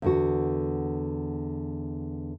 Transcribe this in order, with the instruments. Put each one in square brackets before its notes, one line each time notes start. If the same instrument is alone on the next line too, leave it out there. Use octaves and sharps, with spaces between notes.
[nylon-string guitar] E2 D3 F#4